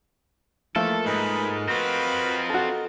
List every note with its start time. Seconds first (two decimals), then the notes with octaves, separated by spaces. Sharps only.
0.76 E3 F3 A3 A#3 A4
1.06 G#2 G#4 A#4 B4 D#5
1.69 C4 F4 F#4 B4
2.50 F#4 A4